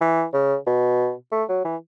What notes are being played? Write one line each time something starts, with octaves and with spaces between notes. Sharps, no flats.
E3
C#3
B2
A3
F#3
E3